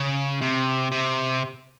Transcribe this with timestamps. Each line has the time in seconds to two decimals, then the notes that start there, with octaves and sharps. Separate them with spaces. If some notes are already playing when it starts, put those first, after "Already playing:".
Already playing: C#3
0.41 C3
0.92 C3